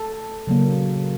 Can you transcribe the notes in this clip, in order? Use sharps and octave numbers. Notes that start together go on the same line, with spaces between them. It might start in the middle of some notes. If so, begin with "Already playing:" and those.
Already playing: A4
C#3 F#3 A#3